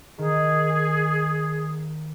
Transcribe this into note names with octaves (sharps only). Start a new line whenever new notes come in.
D#3 G#4